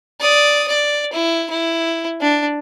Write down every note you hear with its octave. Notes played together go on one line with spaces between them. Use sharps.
D5 D#6
D5
E4
E4
D4